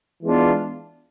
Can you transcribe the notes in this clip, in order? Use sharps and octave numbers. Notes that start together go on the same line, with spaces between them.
E3 G#3 B3 D4 F4